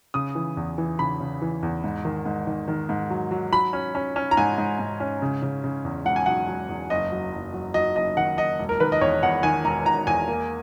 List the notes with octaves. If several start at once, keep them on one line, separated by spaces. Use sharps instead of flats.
C#3 D#6
E3
E2
E3
C#3 B5
C#3
E3
E2
G#2
D#3
G#2
D#3
D#3
G#2
F#3
F#3
F#3 B5
C#4
C#4
C#4
A#5
G#2 G#5
G#2
G#2
C#4
C#3
C#3
C#3
E2
E1 F#5
G#5
F#3 F#5
F#3
E2
F#1 D#5
F#3
F#1
F#3
F#3 D#5
F#1 D#5
D#3 F#5
F#1 D#5
E1
A#4
D#3 B4
D#5
E2 C#5
E2 F#5
D#3 G#5
E1 A#5
E1 A#5
E2 G#5
A#3